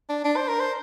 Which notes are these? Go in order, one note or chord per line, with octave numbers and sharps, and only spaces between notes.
D4
D4
C5
A#4
C5